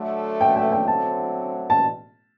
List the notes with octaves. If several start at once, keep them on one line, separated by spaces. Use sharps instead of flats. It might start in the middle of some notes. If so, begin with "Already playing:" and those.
Already playing: D3 F#3 A3
G5
G5
G5
D3 F#3 A3 C4 A5
A5